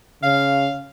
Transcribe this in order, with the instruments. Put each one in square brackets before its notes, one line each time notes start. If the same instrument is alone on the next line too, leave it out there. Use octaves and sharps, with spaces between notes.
[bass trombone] C#3 [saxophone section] F5